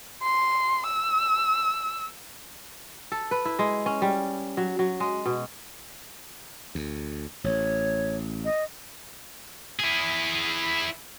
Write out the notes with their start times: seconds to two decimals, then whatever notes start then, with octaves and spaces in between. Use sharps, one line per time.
0.23 C6
0.87 E6
3.12 A4
3.31 B4
3.45 E4
3.59 G#3
3.86 C#4
4.02 G3
4.57 F#3
4.79 F#3
5.00 G#3
5.26 B2
6.75 D2
7.44 A1 C#5
8.44 D#5
9.79 E4 G#4